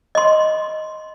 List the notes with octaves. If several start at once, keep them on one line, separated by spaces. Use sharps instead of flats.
D#5 C6